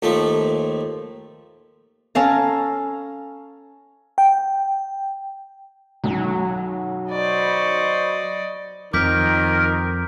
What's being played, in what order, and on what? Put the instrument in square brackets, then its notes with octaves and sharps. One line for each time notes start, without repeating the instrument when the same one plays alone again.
[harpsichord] D#2 F3 A3
[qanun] C#4 A4 F5 A#5
[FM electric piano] G5
[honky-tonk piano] B1 F#2 D#3 [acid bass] F#3
[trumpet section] C5 B5 C#6 [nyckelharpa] D5 D#5
[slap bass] F2 F3 [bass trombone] D#3 [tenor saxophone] A#4 [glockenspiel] D6 G6 B6